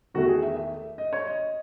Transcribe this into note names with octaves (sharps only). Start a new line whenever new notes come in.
E2 D#3 A3 F#4
G#4
E5
E5
D#5
C#5
D#5